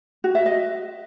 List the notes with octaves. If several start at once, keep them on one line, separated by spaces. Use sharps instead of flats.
F#4
E5
D#5